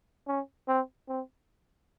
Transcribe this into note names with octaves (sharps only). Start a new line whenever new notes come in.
C#4
C4
C4